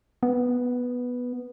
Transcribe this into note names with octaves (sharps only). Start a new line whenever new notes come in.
B3